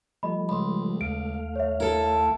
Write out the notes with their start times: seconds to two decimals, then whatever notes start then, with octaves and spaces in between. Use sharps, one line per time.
0.23 F3 G3 A3 D#5 B5
0.49 C#2 B5 C6
1.01 D#2 A3 F5 D7
1.56 C#5 E5
1.80 E4 A4 A#4